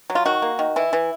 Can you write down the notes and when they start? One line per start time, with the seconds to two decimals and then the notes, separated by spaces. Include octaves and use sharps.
0.10 F#3
0.15 F4
0.25 D#3 F#4
0.42 A#3
0.59 D#3
0.76 E3 E4
0.93 E3